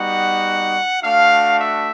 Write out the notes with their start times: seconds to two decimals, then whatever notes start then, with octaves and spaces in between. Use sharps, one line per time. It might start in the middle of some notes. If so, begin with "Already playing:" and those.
Already playing: G3 B3 D#4 F#4 F#5
1.01 A3 D4 F#4 F5
1.58 E5